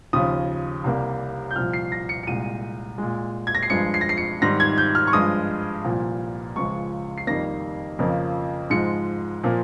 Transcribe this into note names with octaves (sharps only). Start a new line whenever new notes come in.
D#2 C#3 F3 D#6
C2 C3 G3 A#3
G6
C2 A#2 F3 F6
C7
A#6
C#7
C#7
C2 A#2 G#3 D#7
A#2 G#3
G#6
A#6
C7
G2 F3 G#3 C#7
C7
A#6
C7
C#7
G#2 D#3 G3 A#6
G#6
G6
F6
C#6
G2 F3 G#3 D#6
C2 A#2 F3
C#2 C#3 F3 G#3 C#6
C7
F2 D#3 G3 A#3 A#6
F2 C#3 F3 A#3
G#2 F3 G#3 C#7
A#2 F3 A#3